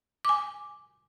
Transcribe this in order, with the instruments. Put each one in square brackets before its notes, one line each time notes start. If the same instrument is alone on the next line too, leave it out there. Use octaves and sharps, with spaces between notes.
[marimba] G#5 D6